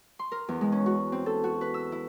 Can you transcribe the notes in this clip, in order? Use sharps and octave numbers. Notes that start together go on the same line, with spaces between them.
C6
A#4
E2
G#3
C#4
F#4
C4
A4
F#4
B4
E6
E4